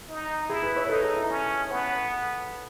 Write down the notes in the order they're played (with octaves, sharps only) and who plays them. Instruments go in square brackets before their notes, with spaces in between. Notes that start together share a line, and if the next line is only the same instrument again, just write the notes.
[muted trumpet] D#4
[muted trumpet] E4 [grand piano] G#4
[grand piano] B4
C#5
B4
[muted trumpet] D#4 [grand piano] A4
[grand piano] G#4
E4
[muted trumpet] C#4
B3